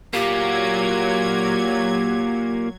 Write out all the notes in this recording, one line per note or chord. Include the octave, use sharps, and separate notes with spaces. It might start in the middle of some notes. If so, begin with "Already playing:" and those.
F#3 A#3 F4 G4 G#6